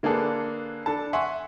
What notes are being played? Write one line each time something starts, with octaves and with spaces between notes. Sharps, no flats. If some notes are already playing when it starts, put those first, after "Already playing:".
D3 A#3 D4 G#4 A4 B4
D4 A4 A5
E5 F#5 G#5 C6 C#6